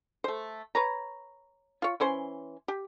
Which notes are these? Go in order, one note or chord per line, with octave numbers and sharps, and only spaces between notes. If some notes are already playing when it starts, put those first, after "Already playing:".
A3 C5
B4 C#5 A#5
F4 C#5
E3 C#4 C5 C6
G4